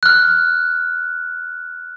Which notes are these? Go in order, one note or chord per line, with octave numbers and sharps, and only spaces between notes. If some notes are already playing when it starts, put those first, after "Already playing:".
F6 F#6